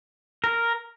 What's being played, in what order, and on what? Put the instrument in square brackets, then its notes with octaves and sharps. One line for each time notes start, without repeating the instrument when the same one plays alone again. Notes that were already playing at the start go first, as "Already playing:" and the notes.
[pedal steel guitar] A#4